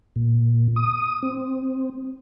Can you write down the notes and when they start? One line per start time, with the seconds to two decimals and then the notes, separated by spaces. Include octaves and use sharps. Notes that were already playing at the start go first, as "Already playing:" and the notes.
0.16 A#2
0.76 D#6
1.23 C4